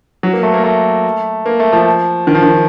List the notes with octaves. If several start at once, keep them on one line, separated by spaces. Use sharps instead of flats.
F#3
A#3
A3
A#3
A3
A#3
A3
F3
D#3
F3
D#3